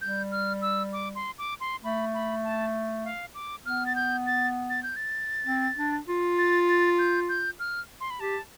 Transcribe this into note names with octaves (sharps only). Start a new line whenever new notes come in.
G3 G6
F6
E6
D6
C6
D6
C6
A3 B5
B5
A5
F5
D6
B3 F6
A6
G6
A6
A6
G6
A6
C4
D4
F4
A6
A6
G6
G6
F6
C6
B5
G4 A5